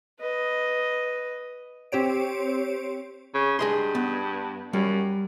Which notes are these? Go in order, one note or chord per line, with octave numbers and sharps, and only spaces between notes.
B4 D#5
C4 G4 C5 C#5 D7
C#3
G2 G#4 D#5 C6
B3
F#2 G3